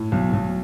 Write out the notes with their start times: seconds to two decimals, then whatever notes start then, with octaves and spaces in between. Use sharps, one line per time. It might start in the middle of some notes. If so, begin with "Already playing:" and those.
Already playing: A2
0.12 B1
0.33 B1